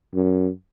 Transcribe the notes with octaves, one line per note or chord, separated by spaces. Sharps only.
F#2